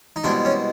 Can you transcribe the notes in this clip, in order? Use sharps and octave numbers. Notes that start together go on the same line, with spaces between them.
D#4
C2 B2 G#3 D4
C#4